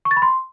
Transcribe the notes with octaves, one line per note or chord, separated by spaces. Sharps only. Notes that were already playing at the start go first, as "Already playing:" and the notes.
C#6
A6
B5
C6